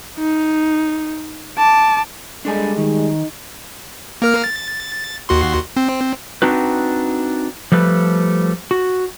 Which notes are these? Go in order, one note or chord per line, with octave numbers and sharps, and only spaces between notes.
D#4
A5 D6
G3 G#3 D4 A4 G#5
D#3 D#4
A#3 A#4 F6
A6
D#2 F#4 C6
C4
C4 D4 D#4 F#4 B4
F3 G3 A3 B4
F#4